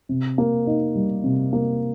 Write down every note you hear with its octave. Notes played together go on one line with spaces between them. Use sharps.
C3
A#3
D#4
G3
C3
A#3